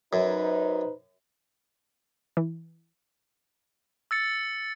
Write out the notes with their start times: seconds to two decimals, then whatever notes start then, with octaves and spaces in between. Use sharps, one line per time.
0.13 F#2 D#4 B4 C5
2.37 E3
4.11 E6 A6 C#7